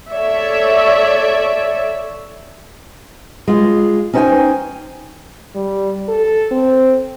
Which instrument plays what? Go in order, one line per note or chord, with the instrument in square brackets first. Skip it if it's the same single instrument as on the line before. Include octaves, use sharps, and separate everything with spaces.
[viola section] A4 C#5 D5 E5
[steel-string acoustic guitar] G#3 F4
C#4 D#4 C5 C#5 G5 G#5
[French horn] G3
A4
C4